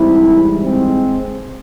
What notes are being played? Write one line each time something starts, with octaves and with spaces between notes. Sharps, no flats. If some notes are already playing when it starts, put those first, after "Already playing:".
Already playing: G#2 E3 G3 C4 E4
G#3 C4